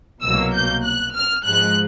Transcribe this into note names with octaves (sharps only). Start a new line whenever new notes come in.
C2 B2 F#3 A#3 E6
G6
F#6
F6
G#2 F3 G#3 F#6